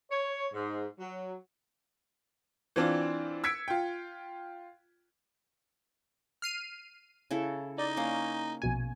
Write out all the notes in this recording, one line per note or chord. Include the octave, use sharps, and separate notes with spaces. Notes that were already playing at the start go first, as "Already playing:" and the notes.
C#5
G#2
F#3
E3 C4 D4 F4
E6 G#6 B6 C#7 D7
F4 G5
F6 C7 D#7
C#3 E4 A4
D#4 D5
A#3 C#4
A#1 B2 G#5